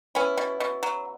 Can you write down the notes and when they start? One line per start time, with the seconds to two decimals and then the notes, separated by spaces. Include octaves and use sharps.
0.15 B3 C#4 E4
0.37 B2
0.60 B2
0.83 F#3